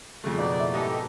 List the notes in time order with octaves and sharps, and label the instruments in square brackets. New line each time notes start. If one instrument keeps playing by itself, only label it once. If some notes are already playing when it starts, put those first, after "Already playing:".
[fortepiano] F2 C#3 A3
[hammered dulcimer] B2 A#3 D#4 [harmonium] D5
[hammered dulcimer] E4 E5
[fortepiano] G#2 D#4 [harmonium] G4 A4 [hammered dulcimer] D#5